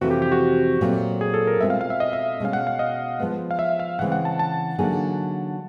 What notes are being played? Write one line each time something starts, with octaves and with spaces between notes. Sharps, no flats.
F2 C3 E3 A3 C4 F#4
G4
G4
F#4
A#2 F#3 A3 C4 F4
G#4
A4
A#4
B2 G#3 C4 F4 E5
F5
F5
E5
D#5
E5
B2 G#3 C#4 F5
F#5
F5
D#5
F3 G#3 B3
F5
E5
F5
C#3 E3 G#3 C4 F#5
F#5
A5
A5
D3 F#3 A#3 D#4 G#4